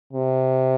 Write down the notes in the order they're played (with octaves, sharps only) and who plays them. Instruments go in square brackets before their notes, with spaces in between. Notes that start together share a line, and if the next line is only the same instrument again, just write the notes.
[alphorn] C3